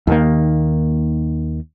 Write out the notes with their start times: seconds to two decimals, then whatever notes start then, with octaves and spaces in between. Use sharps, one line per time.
0.07 D#2 D#3 A#3